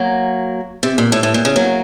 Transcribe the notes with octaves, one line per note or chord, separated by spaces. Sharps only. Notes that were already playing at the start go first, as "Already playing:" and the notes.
Already playing: F#3 A#3
C3
A#2
A2
A2
A#2
C#3
F#3 A#3